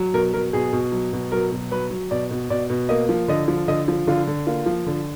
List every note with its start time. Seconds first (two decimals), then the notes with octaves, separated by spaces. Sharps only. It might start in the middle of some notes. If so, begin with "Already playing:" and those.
Already playing: F#3
0.13 B2 A#4
0.33 F#3 A#4
0.53 B2 G#4
0.73 B2
0.92 F#3
1.13 B2
1.32 F#3 A#4
1.52 B2
1.71 F#3 B4
1.90 F#3
2.11 B2 D5
2.31 B2
2.50 B2 D5
2.70 B2
2.89 A#3 D#5
3.09 F3
3.28 D3 D#5
3.48 F3
3.68 D3 D#5
3.88 F3
4.07 D3 F4
4.27 D3
4.47 A#3 F4
4.66 F3
4.87 D3